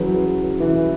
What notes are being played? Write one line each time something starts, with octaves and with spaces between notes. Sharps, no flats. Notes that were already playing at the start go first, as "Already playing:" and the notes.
Already playing: E3 F#3 C#4 E4 G#4 B4
E3